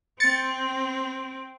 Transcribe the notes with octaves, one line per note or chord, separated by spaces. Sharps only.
C4 A6 C#7